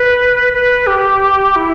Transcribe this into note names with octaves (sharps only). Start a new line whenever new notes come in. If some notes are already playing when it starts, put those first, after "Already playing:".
Already playing: B4
B4
G4
E4